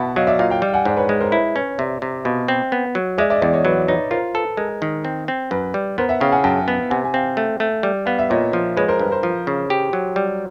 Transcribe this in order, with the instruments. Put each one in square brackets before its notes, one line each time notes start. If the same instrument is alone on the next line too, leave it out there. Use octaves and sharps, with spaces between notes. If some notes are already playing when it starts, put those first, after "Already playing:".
Already playing: [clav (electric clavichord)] B2 [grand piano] E5 F#5 A5 B5
[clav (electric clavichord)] F#3 [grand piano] D#5 F5
[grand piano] D5 E5
[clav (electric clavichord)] A#2 [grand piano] D#5 F5
[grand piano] F5 G5
[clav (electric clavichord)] G3
[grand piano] F#5 G#5
[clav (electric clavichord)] G#2 [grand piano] C5 D5
[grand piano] B4 C#5
[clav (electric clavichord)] G#3 [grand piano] B4
[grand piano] A#4 C5
[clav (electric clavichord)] E4 [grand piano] B4 C#5
[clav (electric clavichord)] C#4 [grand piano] B4 C#5
[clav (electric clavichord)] C3 [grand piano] D5 E5
[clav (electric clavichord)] C3
[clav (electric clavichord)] B2 [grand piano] D#5 F5
[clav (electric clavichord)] C4
B3
F#3
[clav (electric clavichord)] G#3 [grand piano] D5 E5
[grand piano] D5 E5
D#5
[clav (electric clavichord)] E2 [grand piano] D5 E5
[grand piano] C#5 D#5
[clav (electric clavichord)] F#3 [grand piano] B4 C#5
[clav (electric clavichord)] D#4 [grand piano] B4 C#5
[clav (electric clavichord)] F4 [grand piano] A#4 C5
[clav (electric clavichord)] A4 [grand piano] B4
[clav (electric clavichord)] G#3 [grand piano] A#4
[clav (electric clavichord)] D#3
C4
C4
[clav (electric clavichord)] F#2 [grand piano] B4
[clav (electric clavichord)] G3
[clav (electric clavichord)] B3 [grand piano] A#4 C5
[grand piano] E5 F#5
[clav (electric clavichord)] C#3 [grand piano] F5 G5
[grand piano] F#5 G#5
[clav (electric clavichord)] F#2 [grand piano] G5 A5
[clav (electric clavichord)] B3
[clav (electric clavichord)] C3 [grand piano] F#5 G#5
[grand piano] G#5
[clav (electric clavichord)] C4 [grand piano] F5 G5
[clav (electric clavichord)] A3
A3
G3
[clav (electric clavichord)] B3 [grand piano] F5
[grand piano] E5
[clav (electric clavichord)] A#2 [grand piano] C#5 D#5
[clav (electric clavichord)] F3
[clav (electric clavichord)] G#3 [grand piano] B4 C#5
[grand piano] A#4 C5
[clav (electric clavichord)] G2 [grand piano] B4
[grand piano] A#4 C5
[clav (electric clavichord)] F3
C#3
G4
F#3
G3